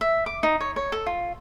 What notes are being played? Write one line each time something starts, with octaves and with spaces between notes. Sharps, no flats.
E5
D6
D#4
C#5
C#5
A4
F4